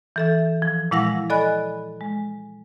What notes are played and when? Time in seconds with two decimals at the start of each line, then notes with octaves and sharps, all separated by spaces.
0.16 E3 A4 E5
0.62 F3
0.91 A#2 G#3 E4 F5 F#5 A#6
1.30 A4 D5 D#5 G#5 B5 F#6
2.01 G#3